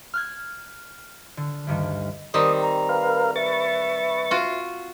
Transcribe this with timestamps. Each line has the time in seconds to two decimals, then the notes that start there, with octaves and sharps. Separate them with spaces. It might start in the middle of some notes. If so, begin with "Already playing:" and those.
0.14 F6 F#6 G#6
1.37 D3
1.67 D2 G2 D#3
2.34 D#3 G3 C4 D#6
2.62 A#5
2.89 A#4 B4 F5
3.36 B4 E5 C#6 A6
4.31 F4 F#4